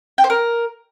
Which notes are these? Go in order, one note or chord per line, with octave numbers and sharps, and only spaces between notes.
G5
C5
A#4